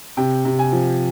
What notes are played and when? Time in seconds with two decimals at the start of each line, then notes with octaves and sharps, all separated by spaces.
0.17 C3 G5
0.45 C3
0.59 G#5
0.72 F3